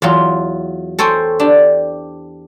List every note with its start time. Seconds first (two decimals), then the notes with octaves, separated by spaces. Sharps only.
0.02 E2 F#3 F4
0.99 A4 C5 C#5 G5 G#5
1.40 D4 G4